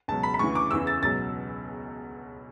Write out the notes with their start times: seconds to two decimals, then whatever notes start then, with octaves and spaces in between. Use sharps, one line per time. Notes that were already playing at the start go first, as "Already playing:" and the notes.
0.08 C#2 B2 F#3 A5
0.23 B5
0.34 B5
0.39 D2 C#3 E3 C#6
0.55 D6
0.71 E2 C#3 E3 E6
0.87 A6
1.02 C#2 B2 F#3 A6